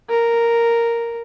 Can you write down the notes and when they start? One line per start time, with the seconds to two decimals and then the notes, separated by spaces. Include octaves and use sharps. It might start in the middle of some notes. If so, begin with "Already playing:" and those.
0.10 A#4